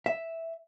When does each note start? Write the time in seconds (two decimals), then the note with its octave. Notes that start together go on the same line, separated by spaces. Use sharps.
0.06 E5